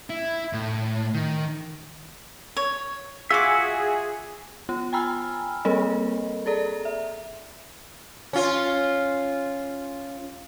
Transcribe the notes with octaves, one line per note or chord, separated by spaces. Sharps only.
E4
A2
D#3
C#5
F4 F#4 G#4 E5 D6
B3 F4
G5 G#5 A#5 B5 E6 F6
G3 A#3 C4 A4 A#4 D#5
G#4 A4 D5 A#5
E5
C#4 F4